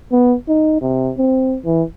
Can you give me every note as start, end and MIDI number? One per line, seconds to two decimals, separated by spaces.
0.12 0.35 59
0.48 0.81 63
0.81 1.11 48
1.17 1.57 60
1.65 1.83 52